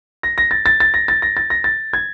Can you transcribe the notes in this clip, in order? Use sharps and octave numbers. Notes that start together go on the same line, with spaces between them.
A#6
A#6
A6
A6
A6
A#6
A6
A#6
A6
A#6
A6
G#6